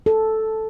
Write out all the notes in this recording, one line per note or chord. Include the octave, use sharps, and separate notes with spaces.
A4